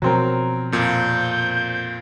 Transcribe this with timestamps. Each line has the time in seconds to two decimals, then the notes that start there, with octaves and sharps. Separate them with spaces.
0.02 B2 F3 F#3 C4 A#4
0.72 F2 A#2 G6